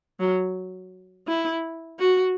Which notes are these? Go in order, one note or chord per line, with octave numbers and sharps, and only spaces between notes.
F#3
E4
F#4